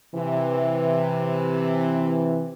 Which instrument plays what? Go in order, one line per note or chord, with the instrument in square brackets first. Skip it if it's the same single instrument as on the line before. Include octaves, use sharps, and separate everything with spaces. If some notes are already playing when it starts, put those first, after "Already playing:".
[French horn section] C3 E3